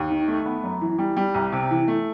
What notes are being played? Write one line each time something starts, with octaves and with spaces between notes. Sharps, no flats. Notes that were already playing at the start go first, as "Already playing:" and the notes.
Already playing: D#2
D#3
A3
B3
F#2
E3
G3
G3
C2
C3
E3
A3